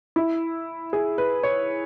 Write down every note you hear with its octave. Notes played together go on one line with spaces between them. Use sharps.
E4
G#4
B4
C#5